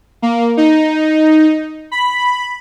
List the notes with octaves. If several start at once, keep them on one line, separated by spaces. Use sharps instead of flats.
A#3
D#4
B5